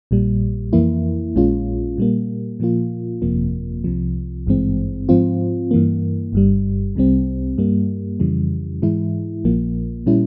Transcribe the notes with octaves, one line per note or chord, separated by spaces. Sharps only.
A#1 A#2 G3
F2 E3 A#3 E4
A#1 A#2 G#3 C#4 F4
A#2 G3 A#3
A#2 F3 A#3 F4
G1 F2 C3 F3 A#3
C2 C3 F3
G#1 G2 E3 G#3 C4
G#2 F3 C4 F4
G2 E3 A#3
G1 G2 G3
C2 C3 G3 C4
G2 G3 A#3
F2 C#3 E3 G3
G#2 E3 G#3 E4
A#1 A#2 F3 A#3
A#2 G3 C#4 E4